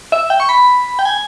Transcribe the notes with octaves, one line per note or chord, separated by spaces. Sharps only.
E5
G5
C#6
B5
G5
G#5